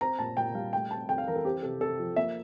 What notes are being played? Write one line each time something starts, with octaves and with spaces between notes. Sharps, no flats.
C4 A#5
A#2 A5
A#2 G5
G3 F5
A3 G5
C4 A5
F2 G5
F5
E3 A#4
A4
C4 G4
C3 A4
C3 A4
F3
A#3 E5